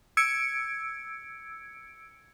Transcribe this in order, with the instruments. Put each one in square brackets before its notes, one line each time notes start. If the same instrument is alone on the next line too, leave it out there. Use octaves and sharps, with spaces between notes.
[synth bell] E6 G#6 C#7 D7